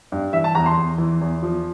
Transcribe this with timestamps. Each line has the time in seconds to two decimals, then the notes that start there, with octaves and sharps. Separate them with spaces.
0.12 G2
0.33 E3 E5
0.44 A5
0.55 E2 A#5
0.66 C6
0.77 E2
0.98 E3
1.21 E2
1.43 F3